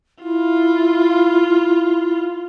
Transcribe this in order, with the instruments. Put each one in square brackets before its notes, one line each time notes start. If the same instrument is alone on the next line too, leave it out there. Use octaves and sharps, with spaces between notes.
[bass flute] E4 [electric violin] F4